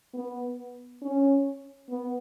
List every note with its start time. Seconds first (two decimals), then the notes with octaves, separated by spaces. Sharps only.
0.14 B3
1.02 C#4
1.90 B3